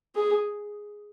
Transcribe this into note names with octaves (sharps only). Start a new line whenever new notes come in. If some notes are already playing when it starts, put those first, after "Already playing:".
G#4